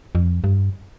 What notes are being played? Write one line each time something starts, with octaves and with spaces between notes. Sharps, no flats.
F2
G2